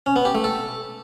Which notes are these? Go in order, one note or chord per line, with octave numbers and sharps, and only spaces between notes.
C#4
B3
G4
A3
A4